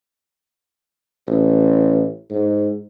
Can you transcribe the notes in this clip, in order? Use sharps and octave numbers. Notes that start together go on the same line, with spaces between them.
A1
G#2